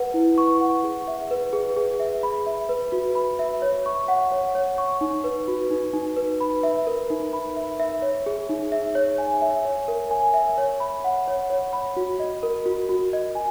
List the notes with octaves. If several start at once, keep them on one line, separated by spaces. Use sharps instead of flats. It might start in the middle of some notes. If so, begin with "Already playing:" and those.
Already playing: B4 F#5
E4
C#6
F#5
G#4
E5
B4
G#4
G#4
E5
B5
E5
B4
F#4
B5
E5
C#5
C#6
F#5
C#5
C#5
C#6
D#4
B4
F#4
D#4
D#4
B4
B5
E5
A#4
D#4
B5
E5
E5
C#5
G#4
D#4
E5
C#5
G#5
E5
C#5
A#4
G#5
E5
C#5
B5
F#5
C#5
C#5
B5
F#4
D#5
A#4
F#4
F#4
D#5
G#5